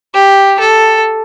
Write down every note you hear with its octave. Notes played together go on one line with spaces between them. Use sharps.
G4
A4